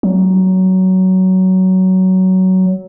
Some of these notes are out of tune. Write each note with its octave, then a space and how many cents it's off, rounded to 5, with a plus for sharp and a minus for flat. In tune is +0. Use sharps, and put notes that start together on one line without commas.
F#3 +15